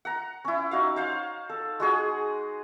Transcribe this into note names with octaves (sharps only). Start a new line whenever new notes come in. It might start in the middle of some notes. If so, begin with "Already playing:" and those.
F#5 A#5
C#4 E4
D#4 F#4 F5
C5 C#5 F5 F#5
A4
G#3 F#4 G#4